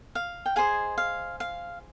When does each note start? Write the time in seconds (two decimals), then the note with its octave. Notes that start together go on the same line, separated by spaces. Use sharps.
0.15 F5
0.46 G5
0.56 G#4 C5 D#5 F5 G#5
0.98 F5
1.40 F5